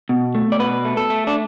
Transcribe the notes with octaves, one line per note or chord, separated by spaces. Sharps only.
B2
A3
D5
B2 B4
A3
A4
A3
D4